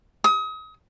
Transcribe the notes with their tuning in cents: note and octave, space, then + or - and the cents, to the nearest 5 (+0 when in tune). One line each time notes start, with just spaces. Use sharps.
D#6 +35